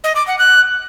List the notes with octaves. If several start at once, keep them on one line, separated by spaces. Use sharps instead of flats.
D#5
D6
F#5
F#6